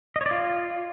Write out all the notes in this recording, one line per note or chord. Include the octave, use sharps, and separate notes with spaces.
D#5
C#5
D5
F4